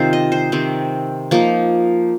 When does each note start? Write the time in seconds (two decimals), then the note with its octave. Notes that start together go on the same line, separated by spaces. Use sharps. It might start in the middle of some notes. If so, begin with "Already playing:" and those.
Already playing: C3 D#3 C4 D#4 F4 C5
0.13 D#5
0.32 C5
0.52 C3 D#3 C4
1.31 F3 A#3 D#4